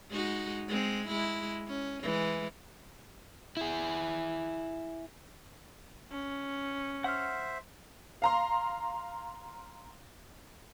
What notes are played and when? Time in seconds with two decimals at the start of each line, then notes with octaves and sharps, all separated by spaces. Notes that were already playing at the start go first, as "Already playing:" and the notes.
0.10 G#3 D#4 F#4
0.68 G#3 C4
1.07 G#3 E4
1.68 C#4
2.02 E3 G#3
3.57 E4 G#4
6.12 C#4
7.04 C5 E5 F#5 F6
8.22 F5 A#5 C6